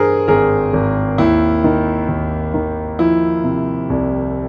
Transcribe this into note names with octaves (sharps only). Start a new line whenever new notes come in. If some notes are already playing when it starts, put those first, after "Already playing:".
Already playing: G2 E3 G#4 A#4 C5
G#1 G#4 A#4
G#1
D#2 E4
D#3
D#2
D#3
F3 E4
C3
C2